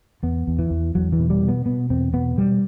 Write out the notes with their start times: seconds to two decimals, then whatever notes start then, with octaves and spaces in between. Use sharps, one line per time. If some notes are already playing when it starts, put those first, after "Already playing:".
0.23 E2 B3
0.47 E2
0.59 E3
0.71 E2
0.95 E2 F#3
1.12 E3
1.19 B2
1.30 G3
1.43 B2
1.48 B3
1.66 B2 B3
1.90 E2 C4
2.13 B2 B3
2.37 B2 G3